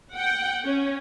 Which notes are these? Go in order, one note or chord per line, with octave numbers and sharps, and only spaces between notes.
F#5 G5
C#4